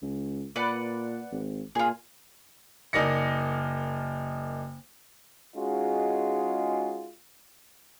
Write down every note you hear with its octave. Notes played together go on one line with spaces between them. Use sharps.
C#2
A#2 B4 D5 F#5
G#1
A#2 F4 G#4
F#1 D#4 A#4 D5 A#6 C#7
G#3 C#4 D#4 F4 F#4 G#4